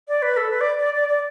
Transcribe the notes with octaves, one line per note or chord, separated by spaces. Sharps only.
D5
B4
A4
B4
D5
D5
D5
D5